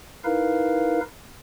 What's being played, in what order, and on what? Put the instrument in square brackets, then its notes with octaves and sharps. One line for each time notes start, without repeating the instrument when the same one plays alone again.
[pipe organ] D#4 E4 A#4 B4 F5